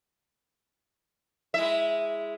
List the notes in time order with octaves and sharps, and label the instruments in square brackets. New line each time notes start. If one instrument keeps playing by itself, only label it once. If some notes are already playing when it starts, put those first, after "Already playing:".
[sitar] G#3 E4 E5